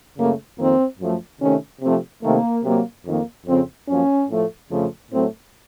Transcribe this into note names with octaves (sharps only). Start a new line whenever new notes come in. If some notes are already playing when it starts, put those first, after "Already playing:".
F#2 C#3 A3 A#3
F2 D#3 A#3 C4
F#2 F3 A3
C3 D#3 A3 C#4
C3 F3 A3 C4
C3 D#3 A3 A#3
C3 F#3 A#3
F2 D#3 A#3
F2 C#3 F3 C4
F#2 F3 A#3 C#4
A2 F3 A3
F2 C#3 F3 A3
A2 F#3 A3 C4